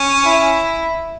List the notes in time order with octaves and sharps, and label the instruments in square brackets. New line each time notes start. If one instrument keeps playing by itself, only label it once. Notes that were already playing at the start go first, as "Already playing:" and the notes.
Already playing: [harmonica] C#4
[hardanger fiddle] E4